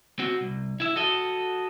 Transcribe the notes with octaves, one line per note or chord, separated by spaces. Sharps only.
C4 F#4
C2
E4 E5
F#4 A4 D#5